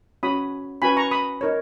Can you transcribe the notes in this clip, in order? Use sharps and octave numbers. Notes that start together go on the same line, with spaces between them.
C#4 F#4 C#5 B5 D#6
C#4 F#4 B4 G#5 B5
A#5 C#6
B5 D#6
D#4 A#4 C#5